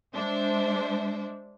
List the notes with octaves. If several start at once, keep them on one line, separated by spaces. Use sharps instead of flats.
G#3 D4 C5 E5